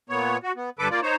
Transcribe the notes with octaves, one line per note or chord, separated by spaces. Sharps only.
A#2 B3 C#5
F#4
B3
G2 D3 A4 B4 D6
A#3 F4 D5
D#4 C5 C#5